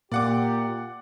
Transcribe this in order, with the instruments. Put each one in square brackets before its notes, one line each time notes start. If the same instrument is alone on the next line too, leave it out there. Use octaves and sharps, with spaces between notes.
[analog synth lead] A#2 [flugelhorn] G4 [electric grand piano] D5 F#5 D6